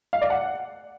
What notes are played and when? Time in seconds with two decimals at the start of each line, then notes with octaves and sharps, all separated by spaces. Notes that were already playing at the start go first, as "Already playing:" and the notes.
0.13 F5
0.22 D5
0.30 F#5